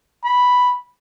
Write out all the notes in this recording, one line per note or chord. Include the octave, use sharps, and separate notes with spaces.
B5